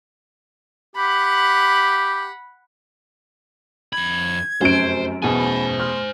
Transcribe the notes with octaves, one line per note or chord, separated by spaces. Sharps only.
G4 F#5 B5
F2 B5 G#6
F1 F#2 C#4 C5 D7
E2 B2 C5 G#5
B5
C6 F6